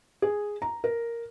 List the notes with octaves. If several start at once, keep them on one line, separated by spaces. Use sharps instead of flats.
G#4
A#5
A#4